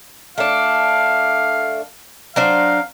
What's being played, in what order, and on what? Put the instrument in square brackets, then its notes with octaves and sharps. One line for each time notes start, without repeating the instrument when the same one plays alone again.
[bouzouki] A3 D4 [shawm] F5
[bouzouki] F#3 D4 C5 [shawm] F5